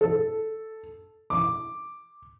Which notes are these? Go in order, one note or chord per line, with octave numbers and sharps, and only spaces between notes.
A4
D6